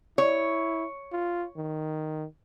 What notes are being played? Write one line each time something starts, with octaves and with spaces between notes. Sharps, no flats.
E4 C#5
F4
D#3